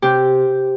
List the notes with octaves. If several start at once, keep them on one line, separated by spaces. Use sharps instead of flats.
C3 G4